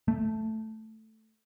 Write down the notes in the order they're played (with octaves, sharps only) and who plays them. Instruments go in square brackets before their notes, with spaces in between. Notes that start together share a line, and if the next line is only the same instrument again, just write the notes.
[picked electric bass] A3